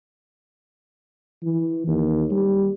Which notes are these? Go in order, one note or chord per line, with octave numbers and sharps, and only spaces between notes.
E3
D#2
G3